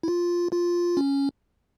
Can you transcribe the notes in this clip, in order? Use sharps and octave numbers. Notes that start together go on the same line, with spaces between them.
E4
F4
F4
C#4